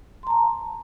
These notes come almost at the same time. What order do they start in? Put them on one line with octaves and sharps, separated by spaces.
C6 A#5 A5